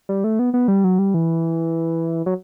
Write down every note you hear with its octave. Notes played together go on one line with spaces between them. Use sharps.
G3
A3
B3
B3
G3
F#3
G3
E3
F#3